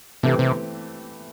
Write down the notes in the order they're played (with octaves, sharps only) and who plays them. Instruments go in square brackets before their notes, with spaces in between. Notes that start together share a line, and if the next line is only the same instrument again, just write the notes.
[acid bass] C3 [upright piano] E3 A3 C4 G4
[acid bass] C3